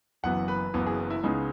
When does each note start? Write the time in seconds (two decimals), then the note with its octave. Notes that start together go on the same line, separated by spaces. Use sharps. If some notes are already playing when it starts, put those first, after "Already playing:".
0.23 F#1 F#2 E3 B3 F#5
0.48 B4
0.74 F#1 F#2 E3 B3
0.87 G#4
1.10 E4
1.23 C#2 C#3 G#3 B3 D#4